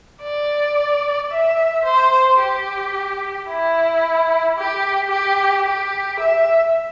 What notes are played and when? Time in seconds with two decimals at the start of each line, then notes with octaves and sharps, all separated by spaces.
0.22 D5
1.31 E5
1.85 C5
2.39 G4
3.49 E4
4.57 G4
5.11 G4
5.66 G4
6.19 E5